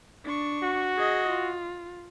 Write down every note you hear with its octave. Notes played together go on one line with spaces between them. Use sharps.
D4 C#6
F#4
G#4 D#5
F4